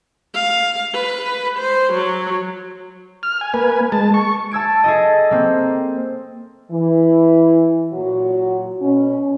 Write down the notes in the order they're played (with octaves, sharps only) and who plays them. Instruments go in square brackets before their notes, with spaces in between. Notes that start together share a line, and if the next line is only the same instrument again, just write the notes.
[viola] F5
B4
C5
F#3
[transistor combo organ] F6
G#5
A#3 B4 G#5
G#3 A5
C#6
[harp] A5 E6 G#6 D7
G#4 A4 D#5
A#3 C4
[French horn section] E3
A#2 F#3 F#4
B2 C#4